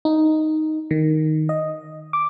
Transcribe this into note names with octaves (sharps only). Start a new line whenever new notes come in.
D#4
D#3
D#5
D6